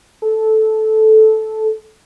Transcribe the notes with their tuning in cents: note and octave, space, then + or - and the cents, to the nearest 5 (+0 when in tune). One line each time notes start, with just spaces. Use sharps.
A4 -10